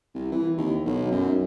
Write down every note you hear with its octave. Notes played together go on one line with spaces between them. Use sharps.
C2
E3
D#2
B1
F#2